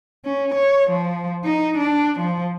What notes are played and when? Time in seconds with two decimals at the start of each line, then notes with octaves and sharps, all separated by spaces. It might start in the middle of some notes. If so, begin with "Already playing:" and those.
0.25 C#4
0.54 C#5
0.90 F3
1.44 D#4
1.78 D4
2.20 F3